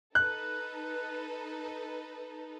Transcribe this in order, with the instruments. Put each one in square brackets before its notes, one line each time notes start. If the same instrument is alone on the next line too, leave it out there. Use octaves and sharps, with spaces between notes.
[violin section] D#4 A4 B4 [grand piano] F#6